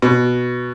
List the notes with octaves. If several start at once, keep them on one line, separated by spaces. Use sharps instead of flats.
B2